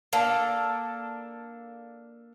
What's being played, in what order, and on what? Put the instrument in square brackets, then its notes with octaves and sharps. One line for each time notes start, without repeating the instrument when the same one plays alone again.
[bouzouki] A#3 D4 A4